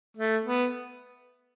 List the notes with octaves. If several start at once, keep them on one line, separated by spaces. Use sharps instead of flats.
A3
B3